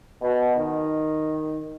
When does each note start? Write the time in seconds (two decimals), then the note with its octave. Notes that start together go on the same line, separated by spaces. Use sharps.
0.22 B2
0.55 D#3